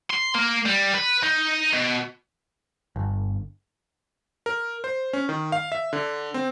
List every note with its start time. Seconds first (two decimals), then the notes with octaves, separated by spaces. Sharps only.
0.10 C6
0.35 A#3
0.65 G3
0.94 B4
1.23 D#4
1.73 B2
2.96 G1
4.46 A#4
4.84 C5
5.13 C#4
5.29 D#3
5.52 F5
5.72 E5
5.93 D3
6.34 C4